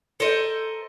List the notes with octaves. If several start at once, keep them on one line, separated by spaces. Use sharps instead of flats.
A4 A#4 C5 D#5